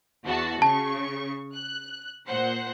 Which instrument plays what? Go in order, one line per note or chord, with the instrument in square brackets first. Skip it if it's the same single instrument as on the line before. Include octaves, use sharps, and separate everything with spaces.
[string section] E2 F#4 A5
[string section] C#3 C#6 [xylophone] A5
[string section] F#6
A#2 C5 F#5